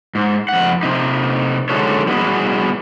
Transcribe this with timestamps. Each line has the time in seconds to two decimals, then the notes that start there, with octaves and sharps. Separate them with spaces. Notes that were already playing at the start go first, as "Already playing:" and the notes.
0.15 G#2
0.49 F2 F#5
0.83 C3 D#4
1.69 D3 G#3 D#4 F#4 A4 C#5
2.07 G3 B3 F#4 G#4 B4 D#5